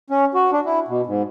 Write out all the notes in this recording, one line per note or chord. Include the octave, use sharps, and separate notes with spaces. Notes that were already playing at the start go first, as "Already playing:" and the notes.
C#4
F#4
D4
E4
B2
G#2